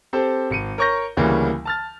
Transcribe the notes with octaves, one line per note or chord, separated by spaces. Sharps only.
C4 G4 A4 C5
G#1 C#7 D#7
A#4 C#5 C#6 G6 A#6
D2 C#3 E3 G3 A#3
A5 F6 A6